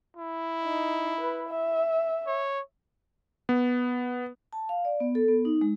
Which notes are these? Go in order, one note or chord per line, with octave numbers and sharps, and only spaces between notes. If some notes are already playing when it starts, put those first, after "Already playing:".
E4
D#4
B4
E5
C#5
B3
A5
F5
D5
B3
A4
B3
D#4
G#3